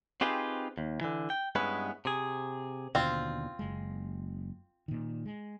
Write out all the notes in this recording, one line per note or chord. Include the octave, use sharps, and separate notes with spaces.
C4 D#4 F4 G4 G#4 B4
D#2
D3 E3
G5
G2 G#3 B3 C#4 E4 B4
C3 G#4
D#2 B2 D3 C4 F4
F#1 G#3
A#2 D#3
G#3